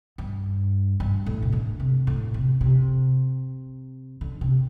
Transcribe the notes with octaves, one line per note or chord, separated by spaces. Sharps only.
G2
G2
A2
C3
D3
C3
A2
C3
C3
D3
C3